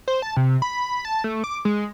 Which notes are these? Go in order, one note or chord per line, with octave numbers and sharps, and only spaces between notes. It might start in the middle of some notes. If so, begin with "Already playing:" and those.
C5
A5
C3
B5
A5
A3
D6
G#3